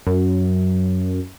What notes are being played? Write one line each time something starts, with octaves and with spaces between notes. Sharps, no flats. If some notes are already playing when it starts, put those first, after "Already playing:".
F#2